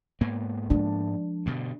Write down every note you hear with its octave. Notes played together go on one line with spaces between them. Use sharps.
G#2 A#3 B3
F3 G#3 D4
G2 B2 D3